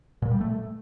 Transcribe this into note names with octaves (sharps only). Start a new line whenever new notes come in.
A#2
G3
A3